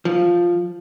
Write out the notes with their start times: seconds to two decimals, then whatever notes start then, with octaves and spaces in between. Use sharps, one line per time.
0.05 F3